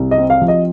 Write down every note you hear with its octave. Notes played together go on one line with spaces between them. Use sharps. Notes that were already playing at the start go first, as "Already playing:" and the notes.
Already playing: C2
D#5
C4
F5
F3
D#5